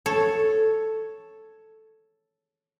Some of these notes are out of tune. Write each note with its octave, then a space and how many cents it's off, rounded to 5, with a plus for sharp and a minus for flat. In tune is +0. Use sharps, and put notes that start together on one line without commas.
A4 +0 C#5 +0